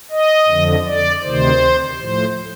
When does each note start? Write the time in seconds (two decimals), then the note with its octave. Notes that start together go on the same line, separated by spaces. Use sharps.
0.11 D#5
0.48 F2 D3 F3
0.86 D5
1.23 D2 C3 D#3 C5
1.99 A2 F3 C5